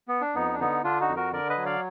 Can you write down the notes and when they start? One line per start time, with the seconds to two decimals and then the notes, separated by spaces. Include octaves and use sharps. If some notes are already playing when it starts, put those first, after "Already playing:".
0.08 B3
0.21 D4
0.35 F2 B3 D#4
0.53 D4
0.60 D3 B3 D#4
0.84 D3 D4 F4
1.00 D#4 F#4
1.09 F2
1.16 F#4 A#4
1.33 D3 A#4 D5
1.49 B4 D#5
1.57 F#3
1.66 D5 F5